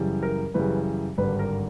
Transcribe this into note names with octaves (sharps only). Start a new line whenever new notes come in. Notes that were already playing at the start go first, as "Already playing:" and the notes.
Already playing: F#2 C#3 E3 G3
A#4
F#2 C#3 E3 G3 B4
G#1 G2 D3 G3 B4
A#4